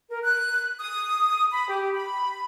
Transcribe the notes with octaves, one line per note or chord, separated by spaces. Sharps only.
A#4
F#6
D#6
B5
G4
B5